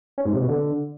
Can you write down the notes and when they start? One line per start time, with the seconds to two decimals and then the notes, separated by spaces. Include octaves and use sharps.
0.18 C#4
0.25 G#2
0.33 C3
0.41 B2
0.49 D3